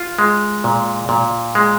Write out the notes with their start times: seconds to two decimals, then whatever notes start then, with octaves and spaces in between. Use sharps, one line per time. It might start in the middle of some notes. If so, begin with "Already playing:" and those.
Already playing: F4
0.19 G#3
0.64 A#2
1.09 A#2
1.55 G#3